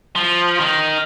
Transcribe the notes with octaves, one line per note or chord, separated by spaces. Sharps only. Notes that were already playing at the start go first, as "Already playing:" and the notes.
F3
D#3